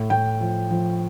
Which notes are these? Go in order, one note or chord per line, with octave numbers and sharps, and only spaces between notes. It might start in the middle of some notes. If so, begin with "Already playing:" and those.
Already playing: A2
A2 G5
F3
F3